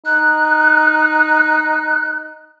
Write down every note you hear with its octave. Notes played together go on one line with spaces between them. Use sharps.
D#4 F#6